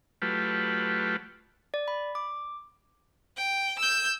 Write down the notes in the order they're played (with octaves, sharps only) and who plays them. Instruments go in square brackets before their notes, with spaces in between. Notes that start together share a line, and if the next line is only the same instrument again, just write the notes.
[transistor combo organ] F#3 A3 F4 G4 B4
[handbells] D5
B5
D6
[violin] G5
E6 G6